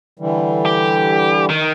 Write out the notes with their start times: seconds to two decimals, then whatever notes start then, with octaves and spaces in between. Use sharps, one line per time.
0.19 D3 E3 G3
0.66 G4
1.50 D#3